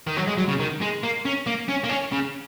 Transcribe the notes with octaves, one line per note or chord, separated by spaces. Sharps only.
D#3
F#3
G#3
F#3
C#3
D#3
G#3
A#3
C#4
A#3
C#4
A#3
C#4
C#3